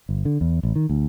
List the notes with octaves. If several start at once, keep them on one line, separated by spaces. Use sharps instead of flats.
G1
D3
E2
A1
D#3
D2